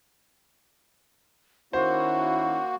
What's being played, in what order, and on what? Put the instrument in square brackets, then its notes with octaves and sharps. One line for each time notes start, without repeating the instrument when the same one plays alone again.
[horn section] D#3 C#4 E4 [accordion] A#3 F#4 [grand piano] C5 [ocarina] F#5